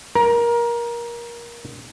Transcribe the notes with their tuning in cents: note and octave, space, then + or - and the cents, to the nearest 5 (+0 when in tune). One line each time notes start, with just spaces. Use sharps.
A#4 +20